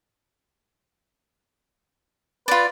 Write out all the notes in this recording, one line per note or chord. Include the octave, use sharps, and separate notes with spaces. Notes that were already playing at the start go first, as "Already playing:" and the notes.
F4 B4 D5